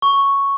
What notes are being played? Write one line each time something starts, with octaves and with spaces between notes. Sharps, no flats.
C#6